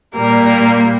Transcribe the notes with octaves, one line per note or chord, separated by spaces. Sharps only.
A#2 G3 A#3 A#4